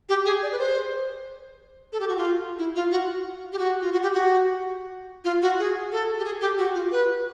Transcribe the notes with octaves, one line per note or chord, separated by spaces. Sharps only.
G4
G#4
D5
B4
C5
A4
G4
F#4
F4
E4
F4
F#4
G4
F#4
F4
F#4
G4
F#4
F4
F#4
G#4
A4
G4
G#4
G4
F#4
F4
B4